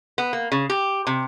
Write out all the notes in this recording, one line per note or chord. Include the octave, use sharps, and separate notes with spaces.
B3
A#3
C#3
G4
C3